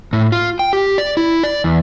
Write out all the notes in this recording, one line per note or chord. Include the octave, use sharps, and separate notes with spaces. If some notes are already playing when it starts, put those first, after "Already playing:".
A2
F4
G5
G4
D5
E4
D5
E2